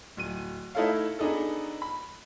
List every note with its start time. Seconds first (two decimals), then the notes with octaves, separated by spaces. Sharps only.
0.17 D1 D#7
0.75 A3 D#4 E4 A4 C#5 F5
1.19 B3 D4 D#4 G#4 A4
1.82 B5